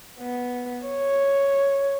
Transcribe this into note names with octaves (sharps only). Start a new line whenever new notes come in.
B3
C#5